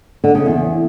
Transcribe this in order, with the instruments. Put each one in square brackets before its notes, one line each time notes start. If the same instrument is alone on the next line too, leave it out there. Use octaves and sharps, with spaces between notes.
[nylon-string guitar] D3
C#3
E2